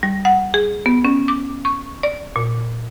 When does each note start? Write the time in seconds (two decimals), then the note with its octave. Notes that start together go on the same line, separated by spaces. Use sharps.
0.03 G3
0.25 F#5
0.54 G#4
0.86 B3
1.05 C#4
1.28 D6
1.65 C#6
2.03 D5
2.36 A#2